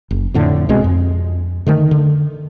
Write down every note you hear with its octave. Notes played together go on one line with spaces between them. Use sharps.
F#1
F2 A2 D3
C2 B2 G#3 C4
F2
D3 D#3 A3
D3